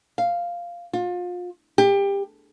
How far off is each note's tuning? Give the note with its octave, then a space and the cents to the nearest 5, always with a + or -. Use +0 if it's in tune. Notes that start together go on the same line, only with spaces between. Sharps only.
F5 -5
F4 +30
G4 +25